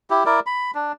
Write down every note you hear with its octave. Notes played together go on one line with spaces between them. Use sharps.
E4 G4
E4 A#4 D5
B5
D4